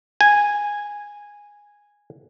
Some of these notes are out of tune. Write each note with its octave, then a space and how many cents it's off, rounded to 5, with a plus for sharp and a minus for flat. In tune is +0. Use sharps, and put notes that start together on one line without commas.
G#5 -10